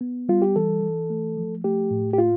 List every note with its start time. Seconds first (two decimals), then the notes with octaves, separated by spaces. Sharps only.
0.01 B3
0.29 G3 F4
0.42 G4
0.56 E3 A4
0.83 E3
1.10 A3
1.37 F3
1.64 A3 G4
1.91 A2
2.13 G4
2.18 F4